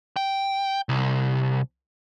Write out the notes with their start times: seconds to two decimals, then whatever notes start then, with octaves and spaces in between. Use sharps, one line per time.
0.17 G5
0.89 C2